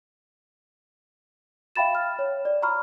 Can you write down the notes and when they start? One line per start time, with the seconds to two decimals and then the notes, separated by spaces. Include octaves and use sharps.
1.76 E5 F5 G5 B5 A6 E7
1.95 F6
2.19 C#5
2.45 D5
2.62 A#5 B5 C#6 F6